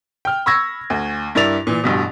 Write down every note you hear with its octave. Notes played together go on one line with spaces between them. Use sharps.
G5 F6
B5 C#6 E6 G#6 A#6
D2
G2 E4 A#4 D5 A6 F7
A#2 E3
A1 G2 B2